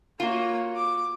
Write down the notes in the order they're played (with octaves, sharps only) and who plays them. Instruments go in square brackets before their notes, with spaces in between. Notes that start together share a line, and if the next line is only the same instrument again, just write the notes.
[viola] A#3 C#5 [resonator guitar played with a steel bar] F4 F#4
[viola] D6